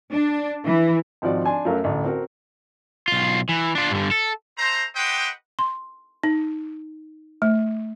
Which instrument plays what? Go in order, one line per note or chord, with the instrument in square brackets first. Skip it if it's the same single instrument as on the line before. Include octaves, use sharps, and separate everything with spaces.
[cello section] D4
E3
[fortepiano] G#1 F3 F#4 D5
D4 G#5 A5 C6
F#2 F#3 A3 A#4 F5
A1 D2
C4 F#4 A#4
[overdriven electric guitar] B1 F4
E3
D4 F4
G2 D3
A4
[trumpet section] A3 C5 A#5
G4 B4 C5 D#5 F#5 G5
[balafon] C6
D#4
A3